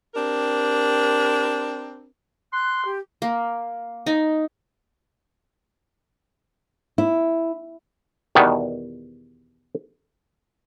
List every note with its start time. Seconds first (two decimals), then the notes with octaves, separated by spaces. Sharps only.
0.15 C4 D4 G4 A#4
2.53 C6 F#6
2.85 G4
3.22 A#3
4.06 D#4
6.98 E4
8.35 E2 B2 D#3 G3 B3